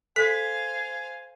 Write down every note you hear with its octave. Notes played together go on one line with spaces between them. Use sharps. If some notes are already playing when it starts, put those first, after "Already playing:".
A4 C5 F5 G#5 B6